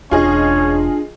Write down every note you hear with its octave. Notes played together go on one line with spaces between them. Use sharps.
E1 E2 C#4 D4 F4 G#4 D#5